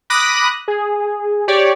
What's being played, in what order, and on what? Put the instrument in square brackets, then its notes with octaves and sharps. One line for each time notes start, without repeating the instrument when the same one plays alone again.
[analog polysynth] B5 D6 D#6 F#6 A#6
G#4
G4 C#5 D5